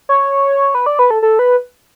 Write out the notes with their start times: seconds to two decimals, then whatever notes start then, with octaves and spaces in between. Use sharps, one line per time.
0.09 C#5
0.75 B4
0.86 D5
0.99 B4
1.11 A4
1.22 A4
1.39 B4